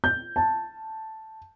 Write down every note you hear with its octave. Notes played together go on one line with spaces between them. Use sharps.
G6
A5